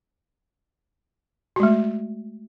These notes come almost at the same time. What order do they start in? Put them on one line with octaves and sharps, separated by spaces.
F#4 G#3 A3